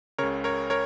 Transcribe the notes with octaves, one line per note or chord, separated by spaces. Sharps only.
C#2 C#3 A#4 C#5
A#4 C#5
A#4 C#5